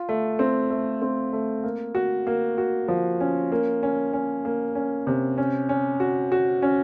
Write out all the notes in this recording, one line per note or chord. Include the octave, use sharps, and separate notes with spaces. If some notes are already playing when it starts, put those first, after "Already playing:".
Already playing: F4
A3
C4
A3
C4
A3
A#3
F#4
A#3
F#4
F3
C#4
A#3
C#4
C#4
A#3
C#4
C3
C#4
C#4
F#4
F#4
C#4